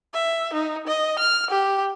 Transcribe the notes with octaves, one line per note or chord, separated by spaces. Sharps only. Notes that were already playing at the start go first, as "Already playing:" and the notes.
E5
D#4
D#5
F6
G4